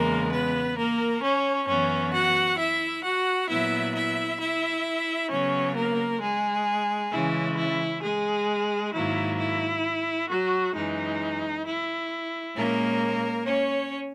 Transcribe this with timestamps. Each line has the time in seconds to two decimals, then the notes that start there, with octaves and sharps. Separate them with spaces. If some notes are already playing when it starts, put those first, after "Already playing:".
Already playing: E2 C#3 G#3 A#3 A#4
0.31 B3 B4
0.76 A#3 A#4
1.22 C#4 C#5
1.67 F#2 E3 B3 C#4 C#5
2.12 F#4 F#5
2.58 E4 E5
3.03 F#4 F#5
3.48 A#2 F#3 B3 E4 E5
3.94 E4 E5
4.39 E4 E5
5.30 C#3 F#3 B3 C#4 C#5
5.75 A#3 A#4
6.21 G#3 G#4
7.11 C#3 E3 G#3 C#4 E4
7.57 E4
8.02 G#3 G#4
8.93 G#2 D#3 F#3 A#3 E4
9.38 E4
10.29 F#3 F#4
10.74 F#2 E3 G#3 D#4
11.65 E4
12.55 A#2 G#3 A#3 C#4 A#4
13.46 C#4 C#5